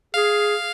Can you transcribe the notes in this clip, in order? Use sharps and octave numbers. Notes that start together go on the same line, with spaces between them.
G#4 F5